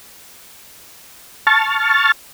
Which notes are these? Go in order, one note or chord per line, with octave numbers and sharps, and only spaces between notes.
A5 C#6 F6 A6